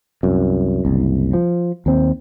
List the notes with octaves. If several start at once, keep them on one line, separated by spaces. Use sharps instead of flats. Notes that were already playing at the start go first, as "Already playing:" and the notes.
C2 F#2
F#1 C2
F3
D#2 C4